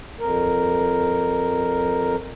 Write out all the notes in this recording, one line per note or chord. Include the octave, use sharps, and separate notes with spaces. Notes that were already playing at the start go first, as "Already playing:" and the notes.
F2 A#4